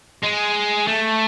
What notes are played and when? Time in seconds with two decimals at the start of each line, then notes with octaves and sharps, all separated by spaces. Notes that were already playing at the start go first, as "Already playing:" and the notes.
0.23 G#3
0.87 A3